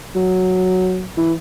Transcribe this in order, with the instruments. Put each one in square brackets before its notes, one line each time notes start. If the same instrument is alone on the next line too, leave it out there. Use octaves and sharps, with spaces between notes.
[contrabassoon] F#3
E3